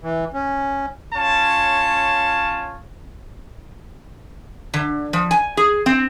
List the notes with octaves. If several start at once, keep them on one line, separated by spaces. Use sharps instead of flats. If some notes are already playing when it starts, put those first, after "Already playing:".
E3
C#4
C#4 F4 C#5 A5
D3
F3
G#5
G#4
C4